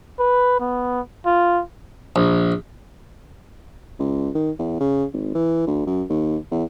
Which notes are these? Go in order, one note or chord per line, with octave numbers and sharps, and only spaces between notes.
B4
B3
F4
A#1
C#2
D#3
E2
C#3
G#1
E3
D2
F#2
D#2
E2